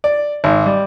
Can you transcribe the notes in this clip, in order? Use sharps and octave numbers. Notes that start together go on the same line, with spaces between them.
D5
G#1
G3